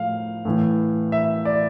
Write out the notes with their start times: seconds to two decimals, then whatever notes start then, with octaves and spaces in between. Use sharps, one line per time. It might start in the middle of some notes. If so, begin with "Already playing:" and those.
Already playing: A2 F3 F5
0.45 A2 E3
1.12 E5
1.45 D5